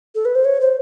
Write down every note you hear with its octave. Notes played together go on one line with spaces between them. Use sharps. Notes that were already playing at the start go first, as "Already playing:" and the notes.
A4
B4
C5
C#5
C5